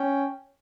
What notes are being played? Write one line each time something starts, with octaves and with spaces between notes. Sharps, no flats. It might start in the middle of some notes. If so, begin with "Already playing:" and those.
Already playing: C#4 G5